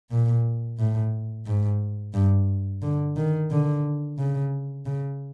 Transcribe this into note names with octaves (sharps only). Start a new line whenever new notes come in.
A#2
A2
G#2
G2
D3
D#3
D3
C#3
C#3